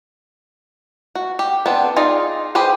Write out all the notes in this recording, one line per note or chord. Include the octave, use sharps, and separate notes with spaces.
F#4
G4
B3 C4 D4
D#4 F4 G#4 D5
G4 G#4 B4 C5